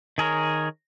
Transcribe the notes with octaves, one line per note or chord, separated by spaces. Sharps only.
D#3 G#4 A#4 C#5